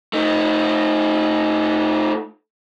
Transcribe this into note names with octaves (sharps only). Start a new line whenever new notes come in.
A3 D#4